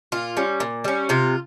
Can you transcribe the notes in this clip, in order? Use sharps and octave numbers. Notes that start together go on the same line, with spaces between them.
A#2 F4
G3 C#4
A#2
G3 C#4
C3 F4